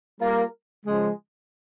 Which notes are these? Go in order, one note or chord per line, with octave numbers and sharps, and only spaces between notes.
G3 A#3 F4 A#4
C#3 F3 G#3